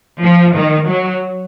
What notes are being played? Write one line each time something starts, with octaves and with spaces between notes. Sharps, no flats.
F3
D#3
F#3